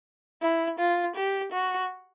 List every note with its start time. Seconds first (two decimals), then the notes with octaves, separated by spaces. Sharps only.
0.42 E4
0.79 F4
1.16 G4
1.52 F#4